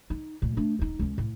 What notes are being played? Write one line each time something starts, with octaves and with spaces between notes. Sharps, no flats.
D#4
D2 A#2
A3 D4
D#1 D#4
C#2 C#3
A2